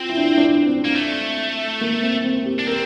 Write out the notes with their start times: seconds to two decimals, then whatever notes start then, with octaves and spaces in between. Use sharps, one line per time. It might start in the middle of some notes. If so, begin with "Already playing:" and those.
Already playing: C4 F4
0.09 E4
0.17 D4
0.26 E4
0.38 D4
0.67 C4
0.85 A#3
0.96 A3
1.81 A#3
2.03 C4
2.24 C4
2.46 G4
2.59 D4
2.67 C4 A#4